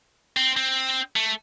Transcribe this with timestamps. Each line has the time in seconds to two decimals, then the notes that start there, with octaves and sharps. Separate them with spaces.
0.37 C4
0.57 C4
1.16 A3